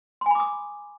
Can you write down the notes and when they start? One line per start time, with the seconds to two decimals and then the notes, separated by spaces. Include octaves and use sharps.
0.21 C6
0.26 G#5
0.31 B5
0.35 D6
0.40 D#6